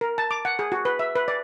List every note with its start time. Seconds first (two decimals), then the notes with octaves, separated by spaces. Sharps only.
0.01 A#4
0.18 A5
0.31 D6
0.45 F#5
0.59 G#4
0.72 F#4
0.85 B4
0.99 E5
1.16 B4
1.28 D5